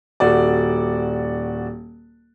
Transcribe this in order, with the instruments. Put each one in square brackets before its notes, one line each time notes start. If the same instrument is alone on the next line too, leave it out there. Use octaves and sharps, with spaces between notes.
[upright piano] D#1 F#4 D5